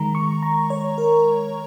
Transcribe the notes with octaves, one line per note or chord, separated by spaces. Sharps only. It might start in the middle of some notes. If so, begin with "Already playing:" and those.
Already playing: D#3 G#3 A#5
C#6
A#5
C#5
A#4